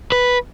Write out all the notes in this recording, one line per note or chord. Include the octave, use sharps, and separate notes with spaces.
B4